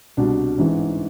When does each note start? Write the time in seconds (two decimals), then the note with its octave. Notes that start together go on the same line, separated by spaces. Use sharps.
0.17 C2 B2 D4
0.58 A1 G#2 E3